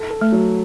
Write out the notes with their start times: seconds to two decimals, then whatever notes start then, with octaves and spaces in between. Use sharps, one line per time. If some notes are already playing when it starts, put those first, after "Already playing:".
Already playing: A4
0.10 A4
0.21 A3
0.32 F#3